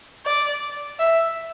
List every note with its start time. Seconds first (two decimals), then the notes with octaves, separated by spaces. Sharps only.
0.26 D5
0.99 E5